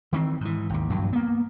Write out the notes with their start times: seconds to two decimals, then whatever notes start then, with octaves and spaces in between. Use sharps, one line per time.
0.13 D#3 E3 A#3 C4
0.41 G#2 E3
0.70 G#1 D#2
0.90 A#1 G2 F#3
1.13 A#3 B3